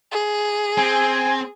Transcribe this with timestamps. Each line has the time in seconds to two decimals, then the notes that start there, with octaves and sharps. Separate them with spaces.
0.12 G#4
0.78 C4 G#5